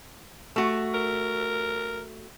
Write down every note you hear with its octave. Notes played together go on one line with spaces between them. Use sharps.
A3 F#4
A#4